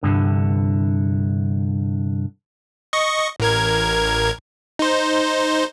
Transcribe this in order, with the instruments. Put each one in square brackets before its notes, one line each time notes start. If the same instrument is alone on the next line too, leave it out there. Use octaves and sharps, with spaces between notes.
[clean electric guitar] C2 G2 D3
[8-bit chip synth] D#5 C#6
A1 A#4 G#6
D#4 C5